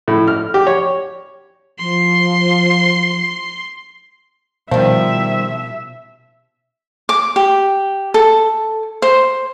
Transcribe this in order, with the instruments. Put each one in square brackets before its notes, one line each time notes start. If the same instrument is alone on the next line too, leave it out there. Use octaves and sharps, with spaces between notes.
[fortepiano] A2
F6
G4
C#5
[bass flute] F3 [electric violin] C6
[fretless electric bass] B2 [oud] D#3 G3 [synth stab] F3 [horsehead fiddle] E5
[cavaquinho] D6
G4
A4
C5